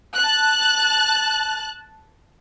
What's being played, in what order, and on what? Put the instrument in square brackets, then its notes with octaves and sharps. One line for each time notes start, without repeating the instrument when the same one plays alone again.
[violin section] A5 F#6